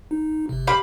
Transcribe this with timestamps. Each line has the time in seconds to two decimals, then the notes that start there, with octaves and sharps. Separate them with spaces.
0.11 D#4
0.49 G1 C3
0.67 G4 F5 B5